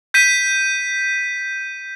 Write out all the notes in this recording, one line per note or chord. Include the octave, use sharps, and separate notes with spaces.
G6 B6 D#7